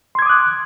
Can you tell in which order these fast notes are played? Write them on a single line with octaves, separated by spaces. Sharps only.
C6 G#6 D6 D#6 F#6